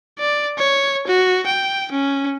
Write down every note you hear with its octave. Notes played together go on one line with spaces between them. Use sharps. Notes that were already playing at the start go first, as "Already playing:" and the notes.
D5
C#5
F#4
G5
C#4